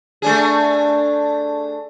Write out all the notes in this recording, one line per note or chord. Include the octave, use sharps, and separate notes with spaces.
A3 D4 G#4